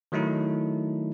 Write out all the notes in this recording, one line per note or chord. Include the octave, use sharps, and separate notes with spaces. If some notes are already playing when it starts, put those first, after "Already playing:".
D#3 F#3 A3 D#4 E4